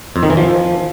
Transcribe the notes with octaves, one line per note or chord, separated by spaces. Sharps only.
F2
D#3
E3
F3